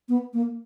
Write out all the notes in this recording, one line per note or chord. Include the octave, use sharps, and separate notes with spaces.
B3
A#3